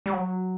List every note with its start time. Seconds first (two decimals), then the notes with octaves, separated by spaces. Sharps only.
0.06 G3
0.13 F#3